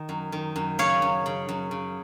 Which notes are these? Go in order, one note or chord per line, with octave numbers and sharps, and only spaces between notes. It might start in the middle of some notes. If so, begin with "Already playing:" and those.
Already playing: D#3
F#2
D#3
F#2
C#3 C#5 F5
F#2
C#3
F#2
C#3